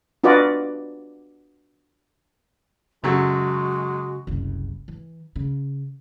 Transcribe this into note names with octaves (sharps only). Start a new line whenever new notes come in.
D4 F4 F#4 B4 D5 D#5
F#2 C#3 F#3 G#3 A3 F#4
F#1 C2
E3
C#3